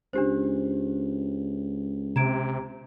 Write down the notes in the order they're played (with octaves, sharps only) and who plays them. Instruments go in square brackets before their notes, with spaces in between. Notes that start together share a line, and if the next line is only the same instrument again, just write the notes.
[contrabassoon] C#2 [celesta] D4 G4 C5
[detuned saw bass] C3 [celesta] A#5 G#6 D7